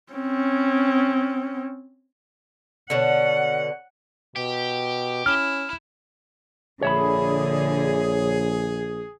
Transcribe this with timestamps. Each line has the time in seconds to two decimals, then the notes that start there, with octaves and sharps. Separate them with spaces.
0.13 C4 C#4
2.90 B2 D3 C#5 F#5 C#7
4.36 B2 G4
5.26 C#4 E4 F6
6.83 A#1 D3 G#4 C#5 E5 B5